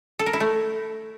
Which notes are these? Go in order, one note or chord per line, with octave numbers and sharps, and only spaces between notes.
A4
A#4
E4
A3